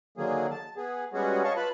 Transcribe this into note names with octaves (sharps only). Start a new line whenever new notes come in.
D3 D#3 F#3 A#3 G#4
A5
B3 G#4
G3 G#3 B3 C#4 F#4 G#4
C#5 D#5 F5 A5 C#6
F4 B4 A5 B5